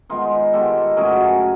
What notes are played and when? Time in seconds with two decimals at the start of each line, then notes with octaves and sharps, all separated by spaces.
0.09 D#3 G#3 B3 D#4 F4
0.53 D#3 G#3 B3 G4 A4
0.97 F#2 C#3 F#3 A3 G#4 A#4